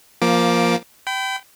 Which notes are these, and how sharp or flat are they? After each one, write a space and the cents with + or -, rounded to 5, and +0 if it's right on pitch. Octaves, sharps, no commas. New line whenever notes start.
F3 +0 A#3 +15 D6 +0
G5 -20 B5 +30